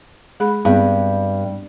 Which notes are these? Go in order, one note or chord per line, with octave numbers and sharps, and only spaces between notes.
G#3 G#4 B5
G2 B3 C4 G#4